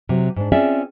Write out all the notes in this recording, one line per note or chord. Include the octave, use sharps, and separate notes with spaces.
C3 F#3
G#2 D4
C4 C#4 F4 G#4 D5 E5